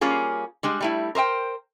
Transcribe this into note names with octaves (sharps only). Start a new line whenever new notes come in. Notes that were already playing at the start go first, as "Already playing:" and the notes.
G3 A#3 C#4 F4 G#4
G3 G#3 D4
G3 A3 E4
A#4 C5 D#5 G5